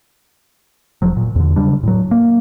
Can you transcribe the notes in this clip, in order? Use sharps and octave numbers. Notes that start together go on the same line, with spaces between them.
E1 F3 F#3
A#2
E2 D3
C#3 F#3 G3 D4
A2 F#3
A#3